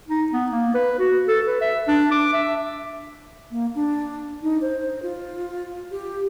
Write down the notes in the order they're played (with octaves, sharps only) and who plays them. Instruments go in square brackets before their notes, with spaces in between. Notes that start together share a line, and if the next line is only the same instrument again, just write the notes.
[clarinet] D#4
B3
A#3
B4
F#4
A4
B4
E5
D4
D6
E5
[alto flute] A#3
D4
D#4
C5
F4
G4